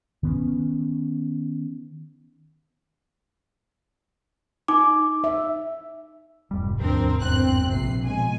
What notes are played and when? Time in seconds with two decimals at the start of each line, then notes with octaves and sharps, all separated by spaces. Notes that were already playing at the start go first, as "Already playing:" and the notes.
0.23 D#3 B3 C#4
4.68 D#4 D6
5.24 E5
6.51 F1 F2 G#2 C3 G3
6.80 D#2 F3 C4 D4 A#4
7.21 G1 E2 G2 C4 F#6
7.69 A#1 C3 C7
8.05 B2 G#3 G#5